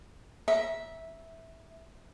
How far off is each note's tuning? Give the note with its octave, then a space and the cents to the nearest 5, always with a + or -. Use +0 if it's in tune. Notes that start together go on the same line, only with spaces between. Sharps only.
E5 -10 A#5 +25